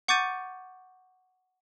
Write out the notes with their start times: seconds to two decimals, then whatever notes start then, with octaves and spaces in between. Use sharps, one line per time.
0.08 F#5 C#6 D6 G6 A6 D#7